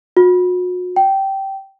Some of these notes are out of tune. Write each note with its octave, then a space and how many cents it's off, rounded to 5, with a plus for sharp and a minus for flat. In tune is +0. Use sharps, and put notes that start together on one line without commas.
F#4 -40
G5 -15